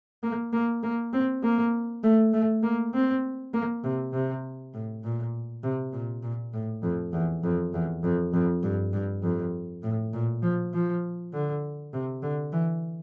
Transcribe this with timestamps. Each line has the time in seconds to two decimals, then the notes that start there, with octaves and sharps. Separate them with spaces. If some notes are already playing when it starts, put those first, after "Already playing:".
0.23 A#3
0.53 A#3
0.83 A#3
1.13 C4
1.43 A#3
2.04 A3
2.33 A3
2.63 A#3
2.94 C4
3.53 A#3
3.83 C3
4.13 C3
4.74 A2
5.04 A#2
5.63 C3
5.93 A#2
6.23 A#2
6.53 A2
6.83 F2
7.13 E2
7.43 F2
7.74 E2
8.04 F2
8.33 F2
8.63 G2
8.93 G2
9.23 F2
9.83 A2
10.13 A#2
10.42 F3
10.74 F3
11.33 D3
11.93 C3
12.23 D3
12.53 E3